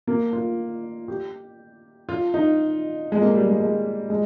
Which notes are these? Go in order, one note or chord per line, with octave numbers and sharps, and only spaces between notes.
A#3
F4
G4
F4
D#4
G#3
A#3
G3
G#3
G#3
G#3